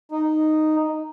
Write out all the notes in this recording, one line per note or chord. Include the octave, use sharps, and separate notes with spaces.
D#4